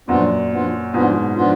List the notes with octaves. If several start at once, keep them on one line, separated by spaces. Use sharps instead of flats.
F#2 A#2 F3 B3 D4 F4
F3 B3 D4 F4
G#2 B2 F3 B3 D4 F4
F3 B3 D4 F4